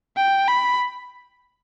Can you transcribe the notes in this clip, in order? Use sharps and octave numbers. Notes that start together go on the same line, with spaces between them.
G5
B5